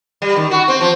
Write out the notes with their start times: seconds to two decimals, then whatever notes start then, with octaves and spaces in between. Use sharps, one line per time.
0.22 G3
0.36 D#3
0.51 F#4
0.68 C4
0.81 F3